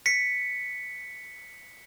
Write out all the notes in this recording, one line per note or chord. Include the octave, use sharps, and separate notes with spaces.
B6 C#7